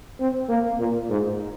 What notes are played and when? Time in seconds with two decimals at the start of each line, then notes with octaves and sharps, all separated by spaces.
0.20 C4
0.49 A#3
0.79 A#2
1.10 G#2